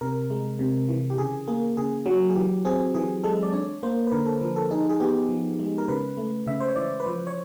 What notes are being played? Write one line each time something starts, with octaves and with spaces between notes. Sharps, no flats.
C3 A#4
G#3
C3
E3
G4
C#3 G#4
A#3 G#4
C#3 G#4
F#3
G#4
E3 G4
C4 G#4
E3 G#4
G#3 A4
D5
D4 C#5
A#3 C5
B4
D3 A#4
A4
F3 A#4
A4
D#4 G#4
G#4
B3 G4
F3
G#3
A#4
C#3 B4
A3
C#3 E5
C5
C#5
E3 D5
B4
F3 C5
C#5